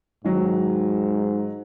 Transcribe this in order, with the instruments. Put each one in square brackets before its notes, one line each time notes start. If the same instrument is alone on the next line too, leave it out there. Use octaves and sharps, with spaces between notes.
[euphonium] G#2 [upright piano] D#3 F#3